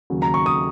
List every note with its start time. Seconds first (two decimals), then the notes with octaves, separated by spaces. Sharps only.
0.10 D#2 C#3 F#3
0.22 A#5
0.34 C#6
0.46 D#6